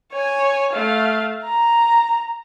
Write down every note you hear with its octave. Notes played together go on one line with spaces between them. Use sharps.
C#5 G#5
A3 F5
A#5